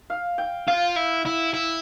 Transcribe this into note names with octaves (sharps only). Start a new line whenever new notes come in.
F5
G5
F4 F5
E4
E4
E4